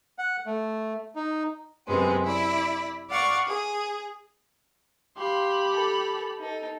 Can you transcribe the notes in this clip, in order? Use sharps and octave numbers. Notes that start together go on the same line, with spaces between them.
F#5
A3
D#4
F#2 C3 G#3 B3
E4 D5
D5 F5 F#5 C#6
G#4
G4 F5 B5 C6
A4
D#4 A4